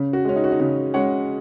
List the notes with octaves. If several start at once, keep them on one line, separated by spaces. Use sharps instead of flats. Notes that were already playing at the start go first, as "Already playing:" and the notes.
Already playing: C#3
F#4
G#3 C#4
D#4
F#4
D#4
C#3 F#4
G#3 C#4 C#5 F#5